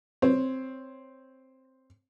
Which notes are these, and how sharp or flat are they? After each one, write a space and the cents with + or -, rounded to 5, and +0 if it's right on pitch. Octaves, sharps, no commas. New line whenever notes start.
C4 +0 C#5 +0